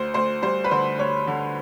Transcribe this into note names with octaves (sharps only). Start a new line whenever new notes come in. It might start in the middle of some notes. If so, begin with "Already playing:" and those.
Already playing: D2 C5
D2 C5
G3 C5
B4
D3 C5
D2 C#5
D3